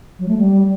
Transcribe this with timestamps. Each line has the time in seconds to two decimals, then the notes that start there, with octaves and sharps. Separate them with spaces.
0.19 F#3
0.28 A3
0.37 G3